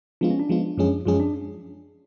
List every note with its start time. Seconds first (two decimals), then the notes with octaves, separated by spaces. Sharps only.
0.21 F3 G#3 B3 D4 F4
0.30 C#4
0.39 D4
0.49 F3 G#3 B3 F4
0.77 F#2 F3 G#3 C#4 G#4
1.06 F#2 F3 G#3 C#4 F4 G#4
1.20 D4